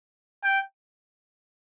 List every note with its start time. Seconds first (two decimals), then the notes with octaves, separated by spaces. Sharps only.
0.44 G5